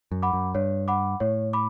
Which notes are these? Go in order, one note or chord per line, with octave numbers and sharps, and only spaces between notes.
F#2
F#5 B5 D6
F#2
G2 C#5
F#5 B5 D6
A2 C#5
B5 D6